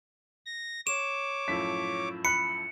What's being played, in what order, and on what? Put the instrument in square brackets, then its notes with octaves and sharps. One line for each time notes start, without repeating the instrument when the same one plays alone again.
[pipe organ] A#6
[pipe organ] C#5 D6 [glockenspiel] E7
[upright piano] F#2 A2 F3 [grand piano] B6
[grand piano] B5 F#6 [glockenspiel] C#7